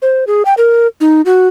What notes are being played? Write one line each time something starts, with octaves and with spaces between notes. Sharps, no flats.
C5
G#4
G5
A#4
D#4
F#4